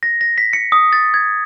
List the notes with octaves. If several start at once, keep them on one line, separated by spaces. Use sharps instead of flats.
A#6
A#6
B6
C#7
D#6
A6
G#6